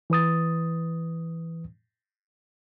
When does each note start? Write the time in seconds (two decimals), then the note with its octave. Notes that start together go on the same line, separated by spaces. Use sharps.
0.10 E3 B4 D#6 A6